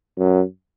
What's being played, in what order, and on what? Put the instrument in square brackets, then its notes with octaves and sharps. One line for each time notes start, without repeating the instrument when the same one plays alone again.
[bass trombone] F#2